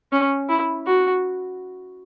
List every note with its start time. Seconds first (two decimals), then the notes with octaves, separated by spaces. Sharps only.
0.12 C#4
0.49 E4
0.86 F#4